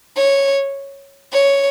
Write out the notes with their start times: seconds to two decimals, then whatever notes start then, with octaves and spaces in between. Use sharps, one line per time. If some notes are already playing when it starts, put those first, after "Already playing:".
0.17 C#5
1.32 C#5